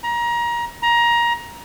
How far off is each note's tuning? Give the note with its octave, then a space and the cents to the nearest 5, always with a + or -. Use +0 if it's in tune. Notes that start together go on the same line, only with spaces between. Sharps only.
A#5 +25
A#5 +20